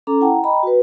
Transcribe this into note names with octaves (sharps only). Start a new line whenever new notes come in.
C#4 A4 A#5 D6
E4 F#5 G5 A5 A#5
D#5 G5 A#5 B5
F#4 B4